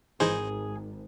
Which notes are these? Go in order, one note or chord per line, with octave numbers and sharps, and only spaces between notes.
G#1 E3 D#4 G#4 C5